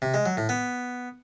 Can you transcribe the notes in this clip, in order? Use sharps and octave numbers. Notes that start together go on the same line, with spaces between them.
C3
G#3
F#3
A2
B3